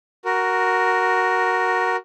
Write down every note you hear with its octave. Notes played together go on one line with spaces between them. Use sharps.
F#4 A#4